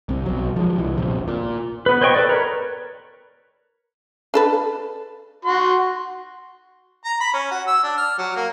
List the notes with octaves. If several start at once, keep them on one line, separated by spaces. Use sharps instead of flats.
C2 C3
B1 F#3
F3 G#3
C2 E3
D#1 A#1 C3
A#2
B3 B4
C5 C#5 D#5 G5 C#6
A4 B4 D5
A#4 B4 C#5
D4 A4 B4
F#4 C6
A#5
B5
C#4
F#4
E6
D4
F6
F#3
A#3